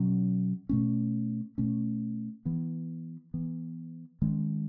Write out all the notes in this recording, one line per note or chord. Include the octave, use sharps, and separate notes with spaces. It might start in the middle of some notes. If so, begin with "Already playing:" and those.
Already playing: B2 F#3 C#4
B2 A3 C#4
B2 A3 C#4
E3 B3
E3 B3
D#3 G#3 C#4